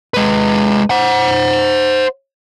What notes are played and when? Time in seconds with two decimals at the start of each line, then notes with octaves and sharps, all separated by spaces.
0.14 G#3 B4
0.90 C5 F#5